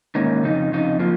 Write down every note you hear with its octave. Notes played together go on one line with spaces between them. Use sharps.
G#2 D#3 A#3 C#4
F2 C#3 D#4
F2 C#3 D#4
F3 A#3 F4